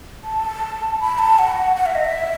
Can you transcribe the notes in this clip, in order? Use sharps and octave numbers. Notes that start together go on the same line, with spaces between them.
A5
B5
A5
F#5
F#5
E5
D#5
E5